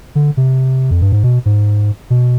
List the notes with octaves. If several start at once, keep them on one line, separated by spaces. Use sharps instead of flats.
D3
C3
F2
G2
G#2
B2
G#2
B2